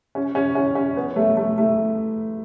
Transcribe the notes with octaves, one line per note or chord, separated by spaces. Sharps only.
C#4
C#4
C#4
C#4
B3
A3
A3
A3